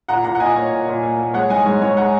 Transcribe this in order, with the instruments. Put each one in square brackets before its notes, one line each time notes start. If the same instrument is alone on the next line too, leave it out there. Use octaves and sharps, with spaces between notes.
[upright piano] A#2 F#5 A#5
A#2 F#5 A#5
F#5
A#2 D#5 G#5
A#3 C#5
A#2
A#2
A#3
A#3
G#3 C#5 F#5
G#2 D#5 G#5
G#2 C#5
G#2 C#5
G#3 F#5 A#5